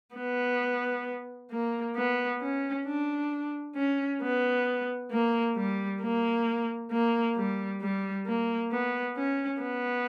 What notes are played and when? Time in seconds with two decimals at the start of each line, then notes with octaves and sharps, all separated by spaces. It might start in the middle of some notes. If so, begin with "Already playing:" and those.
0.16 B3
1.51 A#3
1.96 B3
2.41 C#4
2.86 D4
3.76 C#4
4.22 B3
5.11 A#3
5.56 G3
6.02 A#3
6.91 A#3
7.36 G3
7.81 G3
8.26 A#3
8.72 B3
9.16 C#4
9.62 B3